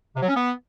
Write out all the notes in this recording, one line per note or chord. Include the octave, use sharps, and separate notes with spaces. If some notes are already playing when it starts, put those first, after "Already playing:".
C3
F#3
C#4
B3